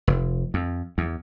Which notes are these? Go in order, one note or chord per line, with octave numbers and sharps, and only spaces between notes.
F1
F2
E2